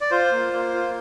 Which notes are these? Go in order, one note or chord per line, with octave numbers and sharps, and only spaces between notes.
D5
F4 C5
A#3
A#3
F4